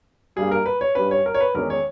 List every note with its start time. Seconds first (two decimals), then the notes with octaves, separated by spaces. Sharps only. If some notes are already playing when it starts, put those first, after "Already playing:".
0.36 G2 G3 A#3 G#4
0.51 A#4
0.66 B4
0.81 C#5
0.95 G2 G3 C#4 B4
1.11 C#5
1.26 A#4
1.34 C#5
1.41 B4
1.55 E2 D#3 G#3 C#4 A#4
1.70 C#5